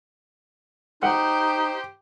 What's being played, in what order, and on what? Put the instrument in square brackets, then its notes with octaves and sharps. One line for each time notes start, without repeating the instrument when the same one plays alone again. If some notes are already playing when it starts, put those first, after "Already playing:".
[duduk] D#4 [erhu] G4 [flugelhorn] C5 [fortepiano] F#5